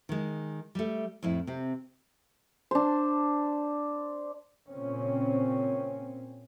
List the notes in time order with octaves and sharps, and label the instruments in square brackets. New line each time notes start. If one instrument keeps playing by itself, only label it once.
[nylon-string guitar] D#3 G#3
G3 A3
F2 A2 E4
C3 C4
[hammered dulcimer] D4 C5
[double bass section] A#2 C#3 C4 C#4